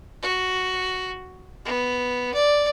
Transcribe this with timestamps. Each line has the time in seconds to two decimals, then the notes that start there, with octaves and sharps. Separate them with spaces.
0.22 F#4
1.65 B3
2.34 D5